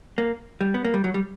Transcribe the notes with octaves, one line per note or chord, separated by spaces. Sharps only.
A#3
G3
B3
A#3
G3
F#3
G3